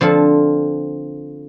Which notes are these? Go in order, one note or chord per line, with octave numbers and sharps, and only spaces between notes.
D3 F3 C4 F4 A4